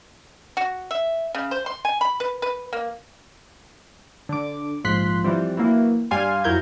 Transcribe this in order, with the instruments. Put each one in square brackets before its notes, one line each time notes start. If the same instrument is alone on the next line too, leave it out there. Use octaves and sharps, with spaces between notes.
[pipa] F#4
E5
C#3
C5
C6
G#5
B5
B4
B4
A#3
[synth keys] D3 D6
A#1 G#2 F3 C6 F#6 B6
E3 F3 G3 C4
E3 F#3 A#3 E4
G2 G3 F5 G#5 C6
F2 F#3 E4 A#4 G6 G#6